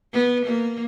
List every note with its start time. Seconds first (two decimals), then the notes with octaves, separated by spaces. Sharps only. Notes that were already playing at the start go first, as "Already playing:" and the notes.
0.13 B3
0.45 A#3